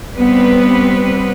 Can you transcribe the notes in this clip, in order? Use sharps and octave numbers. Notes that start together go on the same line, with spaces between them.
G3 B3 C4 B4